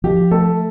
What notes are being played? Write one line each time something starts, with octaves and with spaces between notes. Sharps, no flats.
F3 G4
A3 A4